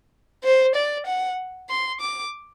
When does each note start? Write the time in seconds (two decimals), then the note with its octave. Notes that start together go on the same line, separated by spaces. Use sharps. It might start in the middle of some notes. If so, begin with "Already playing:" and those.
0.44 C5
0.75 D5
1.06 F#5
1.70 C6
2.01 D6